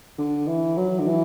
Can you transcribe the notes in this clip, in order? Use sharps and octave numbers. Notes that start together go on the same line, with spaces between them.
D3
E3
F#3
D3
E3